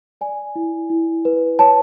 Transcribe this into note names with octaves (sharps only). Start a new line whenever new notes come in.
D5 G#5
E4
E4
B4
C#5 A5